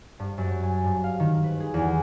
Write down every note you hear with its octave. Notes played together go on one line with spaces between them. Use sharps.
G2
F#2
G#5
G2
F5
D#3
B4
G#4
E2